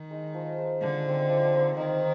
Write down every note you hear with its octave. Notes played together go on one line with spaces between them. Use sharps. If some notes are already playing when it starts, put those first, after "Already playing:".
Already playing: D#3
G#3 D#4
F3
G#3 D#4
D3 F3
C4 D#4
F3
C4 D#4
D#3 D#4